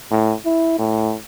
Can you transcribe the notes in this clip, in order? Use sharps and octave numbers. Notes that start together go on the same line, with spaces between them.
A2
E4
A2